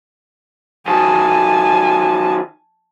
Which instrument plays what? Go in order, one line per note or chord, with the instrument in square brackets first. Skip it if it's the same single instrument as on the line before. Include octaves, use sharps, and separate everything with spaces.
[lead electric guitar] D#3 F#3 [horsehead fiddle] G#5 A5